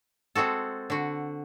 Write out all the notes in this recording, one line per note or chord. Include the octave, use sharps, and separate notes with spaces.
G#3 C4 F#4 A4
D3 F#4